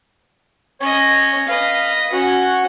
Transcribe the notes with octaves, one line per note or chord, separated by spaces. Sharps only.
C#4 C#5 D#5
B4 D#5 F5
C#4 F#4 F#5